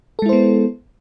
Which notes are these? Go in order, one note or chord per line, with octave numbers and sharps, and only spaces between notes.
G#3 B3 E4 A4 C5